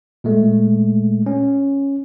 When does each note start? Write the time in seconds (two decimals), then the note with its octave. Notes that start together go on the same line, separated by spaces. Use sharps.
0.24 A#2 G#3 A3
1.26 C#4